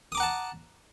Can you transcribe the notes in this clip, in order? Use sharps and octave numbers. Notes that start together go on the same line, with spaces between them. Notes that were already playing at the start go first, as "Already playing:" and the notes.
F#5 A5 A#5 D6 D#6